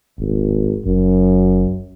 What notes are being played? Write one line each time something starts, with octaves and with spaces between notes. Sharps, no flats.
D1 G#1
F#1 F#2